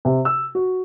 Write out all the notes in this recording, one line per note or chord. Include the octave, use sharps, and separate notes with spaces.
C3
E6
F#4